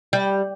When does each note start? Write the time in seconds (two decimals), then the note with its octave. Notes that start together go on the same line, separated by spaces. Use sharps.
0.13 G3